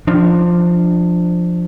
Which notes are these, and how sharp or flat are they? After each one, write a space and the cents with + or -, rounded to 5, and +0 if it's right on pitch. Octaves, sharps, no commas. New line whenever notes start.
F3 +0 D4 +15